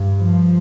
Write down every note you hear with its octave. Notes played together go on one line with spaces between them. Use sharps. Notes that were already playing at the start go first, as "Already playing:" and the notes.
Already playing: G2
F3